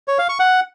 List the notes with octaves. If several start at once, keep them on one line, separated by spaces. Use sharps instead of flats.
C#5
F5
C#6
F#5